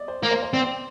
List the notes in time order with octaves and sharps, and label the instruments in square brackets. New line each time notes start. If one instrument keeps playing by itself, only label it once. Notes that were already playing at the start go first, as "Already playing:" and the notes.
Already playing: [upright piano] D5 D#5
C5
[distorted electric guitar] A#3
[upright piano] C5
C5
[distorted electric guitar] C4 [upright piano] D5